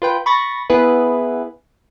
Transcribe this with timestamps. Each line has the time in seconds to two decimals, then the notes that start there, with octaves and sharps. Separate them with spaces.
0.02 F4 B4 G5
0.26 B5 C#6 A6 A#6
0.70 B3 E4 G#4 B4